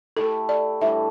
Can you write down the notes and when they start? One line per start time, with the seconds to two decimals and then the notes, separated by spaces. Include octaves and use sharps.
0.17 A3 E4 G4 A4
0.49 D5
0.81 A2 E3 G3 D4 E5